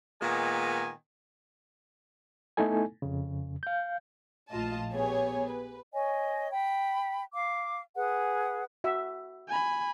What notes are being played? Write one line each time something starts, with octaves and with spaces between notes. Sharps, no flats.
A#2 D#3 G#3 B3 G#5
A3 B3 D#4 E4 A4 G#5
F2 C#3
F5 G6
A#1 A2 F4 D#5 A5
B3 G4 G#4 C#5 G#5
B4
C#5 D#5 G#5
G5 B5
F5 D6
G#4 B4 F#5
F#4 E5
G#5 B5